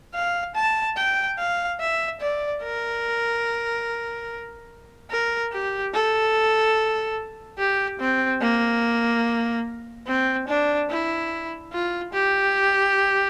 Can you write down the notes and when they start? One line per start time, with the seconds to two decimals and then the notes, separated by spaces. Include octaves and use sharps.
0.14 F5
0.56 A5
0.97 G5
1.39 F5
1.80 E5
2.20 D5
2.63 A#4
5.10 A#4
5.52 G4
5.93 A4
7.59 G4
8.00 C4
8.41 A#3
10.07 C4
10.48 D4
10.90 E4
11.73 F4
12.13 G4